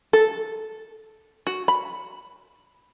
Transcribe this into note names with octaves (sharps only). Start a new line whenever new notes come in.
A4
F#4
B5